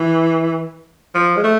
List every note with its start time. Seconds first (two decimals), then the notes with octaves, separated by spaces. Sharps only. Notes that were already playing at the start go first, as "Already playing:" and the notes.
Already playing: E3
1.15 F3
1.36 G#3
1.44 A3